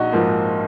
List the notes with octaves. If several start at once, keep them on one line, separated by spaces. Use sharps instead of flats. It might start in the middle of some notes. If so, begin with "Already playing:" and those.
Already playing: A#1 D#4 F#4
G#2 F3 A#3 F4